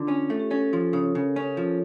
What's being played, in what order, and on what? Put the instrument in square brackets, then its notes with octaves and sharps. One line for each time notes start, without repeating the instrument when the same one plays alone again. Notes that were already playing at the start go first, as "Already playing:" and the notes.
Already playing: [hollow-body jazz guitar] D3 [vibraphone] F4
[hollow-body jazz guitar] C#4
A3
[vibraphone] G4
[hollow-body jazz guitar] C#4 [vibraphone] A4
[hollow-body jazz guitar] F3
[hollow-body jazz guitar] C#3 [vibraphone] C#5
[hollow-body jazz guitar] C#3 [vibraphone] A#4
[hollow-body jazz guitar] C#4
F3